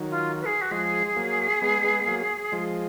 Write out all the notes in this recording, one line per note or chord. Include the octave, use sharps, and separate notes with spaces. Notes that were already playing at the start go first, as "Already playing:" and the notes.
Already playing: D#3 F#3
F4
B4
G#4
F#4
F3 G#3 G#4
F#3 A#3
G#3 B3
G#3 B3
F#3 A#3
F3 G#3